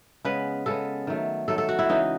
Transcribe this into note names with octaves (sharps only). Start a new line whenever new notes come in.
C#3 G#3 B3 B4
C#3 G#3 B3 A4
D#3 F#3 A3
D#3 F#3 A3 A4
A4
F#4
E4
C#3 E3 G#3 D#4